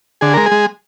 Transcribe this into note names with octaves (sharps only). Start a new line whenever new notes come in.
D3 G#4
G#3 A#4
G#4
G#3